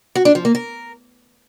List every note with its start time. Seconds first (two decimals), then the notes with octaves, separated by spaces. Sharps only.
0.15 F#4
0.25 D4
0.35 F3
0.45 A#3
0.55 A#4